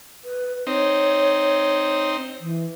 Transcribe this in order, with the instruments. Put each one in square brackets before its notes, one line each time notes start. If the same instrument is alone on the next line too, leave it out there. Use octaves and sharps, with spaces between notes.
[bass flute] B4
[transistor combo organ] C4 D#4 [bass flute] C#5
[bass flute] E3